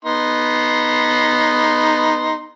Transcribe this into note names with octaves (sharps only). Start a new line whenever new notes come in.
B3 D#4 C6